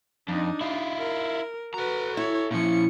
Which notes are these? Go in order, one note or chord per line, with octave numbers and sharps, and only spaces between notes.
F2 D4 D#4
E4 F4
A#4
F#4 A4 B4 A#5
E4 C#5
A#2 F3 C#4 C#7